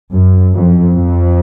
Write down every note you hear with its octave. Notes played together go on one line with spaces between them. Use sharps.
F#2
F2
F2